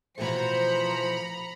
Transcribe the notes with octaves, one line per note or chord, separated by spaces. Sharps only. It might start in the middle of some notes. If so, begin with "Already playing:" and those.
B2 E3 F3 A3 C5 A#5 B5 C#7